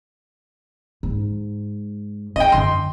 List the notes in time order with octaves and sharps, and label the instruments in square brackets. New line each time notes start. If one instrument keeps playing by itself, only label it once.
[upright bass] G#2
[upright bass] C#4 [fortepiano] D#5 G5
[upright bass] F#2 D3 [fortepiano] C6